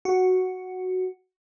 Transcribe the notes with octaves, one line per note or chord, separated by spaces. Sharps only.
F#4